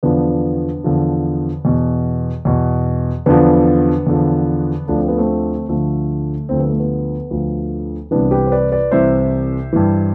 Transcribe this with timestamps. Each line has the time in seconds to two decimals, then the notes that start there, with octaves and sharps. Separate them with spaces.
0.03 E2 D3 F3 B3 D4
0.84 E2 D3 F3
1.65 E2 B2
2.45 E2 B2
3.26 E2 D3 F3 B3 D4
4.07 E2 D3 F3
4.87 D2 D3 F3 D4
4.98 C4
5.08 B3
5.18 A3 C4
5.68 D2 D3 F3 A3
6.49 D2 D3 F3 C4
6.60 B3
6.69 A3
6.80 B3
7.31 D2 D3 F3
8.11 C2 C3 E3 B3 D4
8.31 G4 B4
8.47 C5
8.52 B4 D5
8.72 B4 D5
8.91 C2 C3 E3 C5 E5
9.73 G2 E3